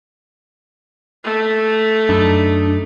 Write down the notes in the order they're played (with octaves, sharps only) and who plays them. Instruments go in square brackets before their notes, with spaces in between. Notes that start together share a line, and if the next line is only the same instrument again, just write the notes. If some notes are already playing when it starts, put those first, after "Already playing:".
[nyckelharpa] A3
[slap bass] F#2 [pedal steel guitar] D4 D#4 B5